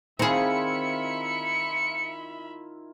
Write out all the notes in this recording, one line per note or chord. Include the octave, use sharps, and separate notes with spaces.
D#3 C4 E4 F4 G#4 E5 B5 C#7